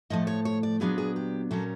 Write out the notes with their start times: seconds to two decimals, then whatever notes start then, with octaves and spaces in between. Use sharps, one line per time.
0.10 A2 F3 A3 D#5
0.27 C#5
0.45 C#5
0.63 D5
0.80 A#2 F#3 B3 D4 G#4
0.98 G#4
1.16 G4
1.51 A#2 F#3 A#3 C#4 A4